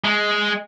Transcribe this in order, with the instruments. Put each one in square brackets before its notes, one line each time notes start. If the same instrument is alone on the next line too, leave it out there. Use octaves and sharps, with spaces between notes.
[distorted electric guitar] G#3